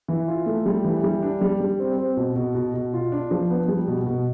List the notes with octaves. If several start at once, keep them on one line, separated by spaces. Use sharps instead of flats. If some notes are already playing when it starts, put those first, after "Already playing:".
E3
F4
A3
G3
E3
G3
D4
G3
G3
C4
C4
B2
B2
B2
B2
F4
D4
F3
B3
G3
B2
B2